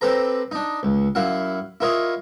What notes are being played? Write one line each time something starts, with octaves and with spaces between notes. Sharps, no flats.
C4 G4 A4 B4 A#5
D4 D#4
C#2
F#2 E4 F5 F#5
E4 F4 A#4 C#5 D#5